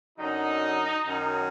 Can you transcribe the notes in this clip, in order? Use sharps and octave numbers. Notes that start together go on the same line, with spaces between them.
F#2 D3 F#3 D#4
F#2 D#3 F#3